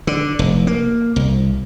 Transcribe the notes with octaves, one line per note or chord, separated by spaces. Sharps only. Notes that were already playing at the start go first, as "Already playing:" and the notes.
D3
F1
A#3
C2